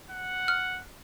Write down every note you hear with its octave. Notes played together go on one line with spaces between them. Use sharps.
F#5
F6